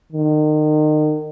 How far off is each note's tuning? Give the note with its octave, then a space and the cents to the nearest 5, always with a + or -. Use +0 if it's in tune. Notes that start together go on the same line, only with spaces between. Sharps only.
D#3 -30